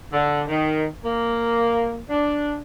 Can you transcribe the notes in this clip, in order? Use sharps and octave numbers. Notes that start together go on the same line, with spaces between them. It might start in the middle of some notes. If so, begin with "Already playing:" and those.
D3
D#3
A#3
D4